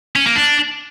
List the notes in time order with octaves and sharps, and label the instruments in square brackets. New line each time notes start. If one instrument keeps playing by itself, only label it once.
[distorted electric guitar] C#4
A#3
D4